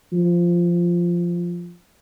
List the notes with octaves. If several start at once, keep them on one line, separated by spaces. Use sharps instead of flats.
F3